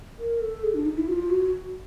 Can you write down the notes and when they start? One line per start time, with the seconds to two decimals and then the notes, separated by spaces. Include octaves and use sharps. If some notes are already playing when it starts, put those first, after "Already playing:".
0.19 A#4
0.41 A4
0.63 G#4
0.74 D4
0.85 D#4
0.97 E4
1.08 F#4
1.12 F4
1.30 F#4